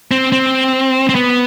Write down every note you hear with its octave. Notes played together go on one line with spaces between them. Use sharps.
C4
C4
C4
B3